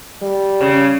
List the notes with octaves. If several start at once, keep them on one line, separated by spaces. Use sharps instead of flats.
G3
C#3